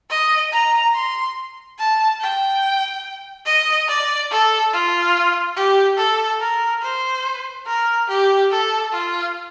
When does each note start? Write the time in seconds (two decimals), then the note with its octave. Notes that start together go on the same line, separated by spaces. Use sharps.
0.10 D#5
0.52 A#5
0.94 C6
1.79 A5
2.21 G5
3.46 D#5
3.88 D5
4.31 A4
4.73 F4
5.56 G4
5.98 A4
6.40 A#4
6.82 C5
7.67 A#4
8.08 G4
8.51 A4
8.92 F4